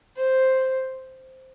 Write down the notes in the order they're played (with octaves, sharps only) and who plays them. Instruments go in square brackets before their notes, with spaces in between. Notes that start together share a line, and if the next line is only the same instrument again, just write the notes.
[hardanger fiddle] C5